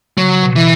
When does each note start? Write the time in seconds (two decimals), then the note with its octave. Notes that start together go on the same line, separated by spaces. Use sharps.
0.17 C#3 F#3
0.43 B2
0.56 E3